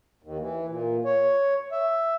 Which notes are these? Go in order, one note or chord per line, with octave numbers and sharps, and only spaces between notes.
D#2
E3
A#2
C#5
E5